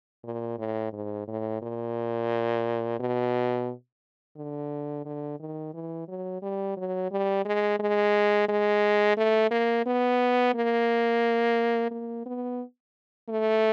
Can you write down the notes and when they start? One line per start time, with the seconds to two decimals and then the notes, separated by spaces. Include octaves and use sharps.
0.24 A#2
0.59 A2
0.93 G#2
1.28 A2
1.62 A#2
2.99 B2
4.36 D3
5.05 D3
5.40 D#3
5.74 E3
6.08 F#3
6.42 G3
6.77 F#3
7.11 G3
7.45 G#3
7.79 G#3
8.48 G#3
9.17 A3
9.51 A#3
9.86 B3
10.55 A#3
11.91 A#3
12.26 B3
13.29 A3